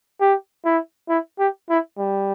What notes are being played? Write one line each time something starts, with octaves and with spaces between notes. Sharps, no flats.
G4
E4
E4
G4
E4
G3